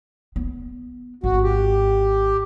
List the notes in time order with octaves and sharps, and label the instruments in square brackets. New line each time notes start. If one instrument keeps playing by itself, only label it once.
[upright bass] B3
[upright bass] G#1 [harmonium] F#4
[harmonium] G4